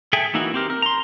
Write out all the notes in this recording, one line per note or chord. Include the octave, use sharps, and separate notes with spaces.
G#4 A4 E5 G5 G#5
E3 A#3 D#4 E4 F#4
C4 G4 A#4
A#4
A#5 C6